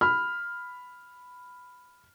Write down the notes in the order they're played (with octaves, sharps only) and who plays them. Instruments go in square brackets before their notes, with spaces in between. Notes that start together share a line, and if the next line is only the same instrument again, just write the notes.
[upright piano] B5 F6